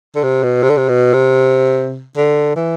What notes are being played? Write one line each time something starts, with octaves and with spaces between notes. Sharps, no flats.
D3
C3
B2
C3
D3
C3
B2
C3
D3
E3